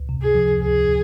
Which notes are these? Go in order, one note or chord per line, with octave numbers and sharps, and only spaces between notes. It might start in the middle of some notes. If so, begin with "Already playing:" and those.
Already playing: C#2
C3
G#4
F3
C#2 G#4